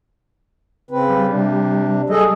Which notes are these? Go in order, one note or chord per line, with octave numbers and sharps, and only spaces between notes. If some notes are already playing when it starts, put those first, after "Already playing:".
C#3 C4 B4
G3
C3 D4
G3 G#4 A4 D#5